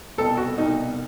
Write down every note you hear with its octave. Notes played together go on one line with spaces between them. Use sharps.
C2 B2 A4
F#4
C2 B2 D#4